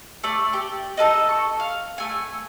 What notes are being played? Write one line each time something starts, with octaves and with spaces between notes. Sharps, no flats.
A3 D5
G4 D5
D#4 A4 B4 D#5
C#6
F5
A3 G#5